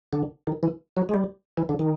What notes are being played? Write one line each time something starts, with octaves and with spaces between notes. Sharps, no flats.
D3
D#3
E3
F#3
G#3
G3
E3
D3
D#3